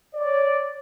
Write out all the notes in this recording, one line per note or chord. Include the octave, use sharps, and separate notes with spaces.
C#5 D5